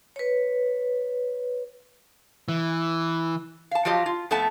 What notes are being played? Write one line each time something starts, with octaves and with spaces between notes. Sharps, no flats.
B4 C#5
E3
F5 A5
F3 F#3 F4 G4 D#5
F4
F2 A3 B3 E5 A5